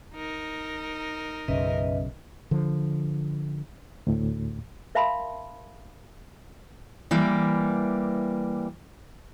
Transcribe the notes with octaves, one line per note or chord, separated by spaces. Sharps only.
D#4 A#4
B1 F#2 C#3 B4 D#5 E5
D3 F3
D2 A2
A#4 E5 F5 A5 B5 C6
E3 G3 A#3